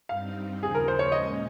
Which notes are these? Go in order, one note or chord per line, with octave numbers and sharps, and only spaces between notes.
G2 G3 C4 D#4 F5
D#2 C#3 F3 G#4
A#4
C5
C#5
A#2 G#3 C#4 D#5